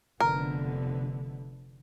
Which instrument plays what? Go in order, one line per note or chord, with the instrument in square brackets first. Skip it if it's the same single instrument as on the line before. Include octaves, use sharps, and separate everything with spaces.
[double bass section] F1 D3 B3 [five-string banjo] A#4